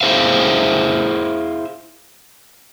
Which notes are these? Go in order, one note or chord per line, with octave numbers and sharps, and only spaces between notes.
E4 G#4 C5 E5 F5